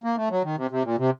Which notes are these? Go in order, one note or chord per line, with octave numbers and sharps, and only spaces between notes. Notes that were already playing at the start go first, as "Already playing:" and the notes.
A#3
A3
F#3
D#3
C3
C3
A#2
C3